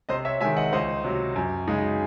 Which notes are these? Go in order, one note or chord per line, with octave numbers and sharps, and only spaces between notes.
C3 C5 D#5
C#5 E5
D#3 G#3 E5 G#5
D#5 F#5
C#2 C5 D#5
C3 F#3
F#2
C#3 G#3 D#4